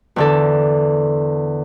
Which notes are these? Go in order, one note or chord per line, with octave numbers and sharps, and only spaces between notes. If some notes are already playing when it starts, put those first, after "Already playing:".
E2 D3 A4